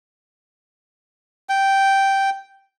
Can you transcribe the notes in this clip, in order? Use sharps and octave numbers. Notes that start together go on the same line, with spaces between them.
G5